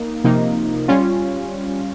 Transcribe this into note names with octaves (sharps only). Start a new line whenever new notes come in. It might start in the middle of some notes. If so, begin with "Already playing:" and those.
Already playing: A#3 D#4
C3 F3 A#3 D#4
G3 C#4 F4